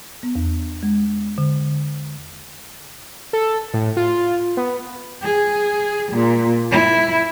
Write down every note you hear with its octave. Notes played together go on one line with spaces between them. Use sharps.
B3
E2
G#3
D3
A4
A2
F4
B3
G#4
A#2
E4